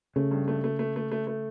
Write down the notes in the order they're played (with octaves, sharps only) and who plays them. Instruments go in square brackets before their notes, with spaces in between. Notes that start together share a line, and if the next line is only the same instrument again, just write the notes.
[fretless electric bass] C#3 [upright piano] A3
[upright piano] G2
A3
A3
A3
A3
A3
A3